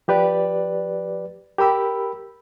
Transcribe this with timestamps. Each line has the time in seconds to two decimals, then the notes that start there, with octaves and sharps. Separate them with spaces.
0.08 F3 G4 B4 D5
1.58 G4 A#4 B5 E6